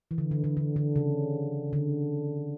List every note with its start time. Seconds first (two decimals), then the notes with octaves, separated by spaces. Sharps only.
0.11 E3
0.18 D3
0.31 D3
0.44 D3
0.57 D3
0.76 D3
0.96 C#3
1.73 D3